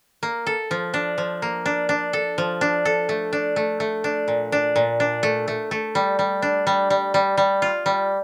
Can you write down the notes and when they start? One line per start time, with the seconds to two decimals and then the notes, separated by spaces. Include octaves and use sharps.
0.23 A#3
0.47 A4
0.71 F3
0.94 D4
1.18 F3
1.42 A#3
1.66 D4
1.89 D4
2.13 A4
2.38 F3
2.61 D4
2.85 A4
3.09 A3
3.33 D4
3.56 A3
3.80 A3
4.04 D4
4.28 A#2
4.52 D4
4.76 A#2
5.00 D4
5.23 A3
5.48 A3
5.71 A3
5.95 G3
6.19 G3
6.42 D4
6.67 G3
6.90 G3
7.14 G3
7.37 G3
7.62 F4
7.86 G3